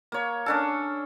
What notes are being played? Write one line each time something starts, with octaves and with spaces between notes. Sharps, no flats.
A#3 C#5
C#4 D4 A4